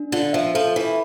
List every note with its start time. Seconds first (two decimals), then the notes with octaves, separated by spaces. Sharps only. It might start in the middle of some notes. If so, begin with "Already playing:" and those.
Already playing: D4
0.12 D3 F4
0.33 F3 E5
0.55 F3 A4
0.76 E3 E4